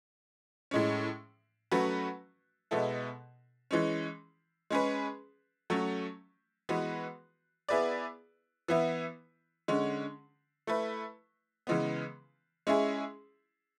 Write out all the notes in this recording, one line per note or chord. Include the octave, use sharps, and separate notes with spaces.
A2 G#3 C#4
F#3 A3 C#4 F#4 B4
B2 G#3 B3 E4 A4
E3 G#3 C#4
G#3 C#4 G#4 B4
F#3 A3 C#4
E3 G#3 B3 F#4 B4
B3 E4 G#4 B4 D5
E3 B3 E4
D3 G#3 C#4
A3 E4 B4
C#3 E3 G#3 B3
G#3 C#4 E4 G#4